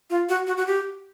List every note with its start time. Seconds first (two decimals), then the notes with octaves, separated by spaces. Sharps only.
0.10 F4
0.29 F#4
0.47 F#4
0.57 F#4
0.67 G4